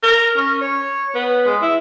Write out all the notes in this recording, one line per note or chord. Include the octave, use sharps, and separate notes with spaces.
A#4
C#4
C#5
B3
G#3
E4